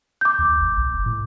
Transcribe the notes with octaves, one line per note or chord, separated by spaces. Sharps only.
D6 G6
D#2
G#1
B1
F#1
A2